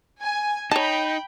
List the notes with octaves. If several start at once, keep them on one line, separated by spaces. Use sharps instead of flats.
G#5
D#4 C#5 G5 A5 B5